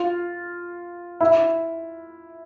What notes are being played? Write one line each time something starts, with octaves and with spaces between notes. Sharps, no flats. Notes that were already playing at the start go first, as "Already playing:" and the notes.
Already playing: F4
E4